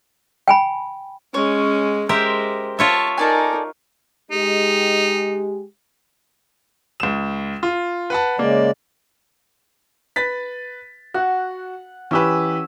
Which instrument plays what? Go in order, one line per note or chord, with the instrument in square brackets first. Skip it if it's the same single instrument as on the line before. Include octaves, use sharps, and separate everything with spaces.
[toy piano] G5 G#5 B5
[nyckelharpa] G#3 C#4 [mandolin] C#5
[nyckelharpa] G#3 [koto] G4 A#4 E5 [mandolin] C5
[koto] F4 C#5 E5 [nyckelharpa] A5
[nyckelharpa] D#4 A#4 [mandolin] A4 D5 G#5
[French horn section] G#3 G4 [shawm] D#4
[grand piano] C#2 E7
F4
B4 F#5 A5
[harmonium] C#3 G#3 D5 [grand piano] A#3
[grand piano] B4 A6 B6
[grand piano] F#4 [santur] F#5
[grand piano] E3 G4 B4 [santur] C#4 E6